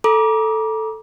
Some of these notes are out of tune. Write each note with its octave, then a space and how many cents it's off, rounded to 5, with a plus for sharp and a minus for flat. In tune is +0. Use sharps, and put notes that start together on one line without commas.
A4 +0 A#5 +35 D6 +0